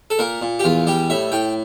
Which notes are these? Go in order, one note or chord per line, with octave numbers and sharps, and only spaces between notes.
A4
A#2 A#4
A#2
G4
E2 F4
G3 G4
A2 E5
A2 G5